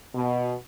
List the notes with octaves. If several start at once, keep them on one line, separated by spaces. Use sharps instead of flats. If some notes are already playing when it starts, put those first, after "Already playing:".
B2